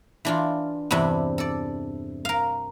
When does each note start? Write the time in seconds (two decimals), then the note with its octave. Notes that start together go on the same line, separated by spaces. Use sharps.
0.25 E3 D4 F4
0.91 E2 G2 C3 D4 E5
1.38 A4 D5
2.25 A#4 F5